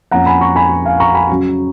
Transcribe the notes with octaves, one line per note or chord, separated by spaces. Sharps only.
F2 F3 A#3 C#4 F#5 A#5
G#5 B5
A#5 C#6
G#5 B5
F5 G#5
A#5 C#6
G#5 B5
C#3 F#3 C#4